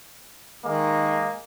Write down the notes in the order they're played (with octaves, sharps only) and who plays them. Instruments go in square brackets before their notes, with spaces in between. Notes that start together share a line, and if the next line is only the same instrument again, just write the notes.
[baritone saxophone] D#3 [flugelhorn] G#3 [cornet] A#3